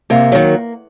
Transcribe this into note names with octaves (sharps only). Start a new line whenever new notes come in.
C3 A#3
D#3 F#3